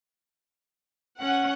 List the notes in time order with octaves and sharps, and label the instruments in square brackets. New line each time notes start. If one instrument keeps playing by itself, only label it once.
[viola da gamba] C#4 [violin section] F#5